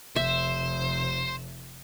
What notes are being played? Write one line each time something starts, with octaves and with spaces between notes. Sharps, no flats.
F1 C5 E5